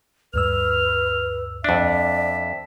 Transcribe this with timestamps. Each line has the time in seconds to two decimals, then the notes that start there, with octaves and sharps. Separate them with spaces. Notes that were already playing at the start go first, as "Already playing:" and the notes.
0.34 D2 G2 B4 E6 F6
1.64 F2 D4 D5 E5